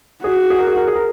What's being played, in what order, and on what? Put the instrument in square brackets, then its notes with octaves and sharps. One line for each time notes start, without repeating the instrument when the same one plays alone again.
[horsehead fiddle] F#4 [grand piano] G#4
[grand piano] G#4
A#4
G#4
A#4
G#4
A#4